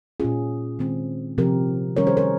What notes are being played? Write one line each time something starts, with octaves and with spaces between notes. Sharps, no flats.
A#2 G#3 C#4 F4 G#4
D#3 G#3 C4
C3 F3 C4 G4 A#4
D#3 G3 C#4 A#4 C#5
G#4 C5
A#4 C#5